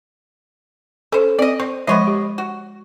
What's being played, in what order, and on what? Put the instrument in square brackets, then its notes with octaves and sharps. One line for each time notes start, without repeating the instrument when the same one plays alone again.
[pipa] C#4 C5 [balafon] A4
[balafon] C4 [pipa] D5 D#5
[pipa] C4 [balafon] C#6
[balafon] F3 G#3 E5 [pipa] B3 C#5 D#5
[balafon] G4
[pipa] F#4